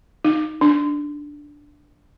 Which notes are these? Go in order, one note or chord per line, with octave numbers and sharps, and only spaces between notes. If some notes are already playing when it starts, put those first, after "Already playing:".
D#4
D4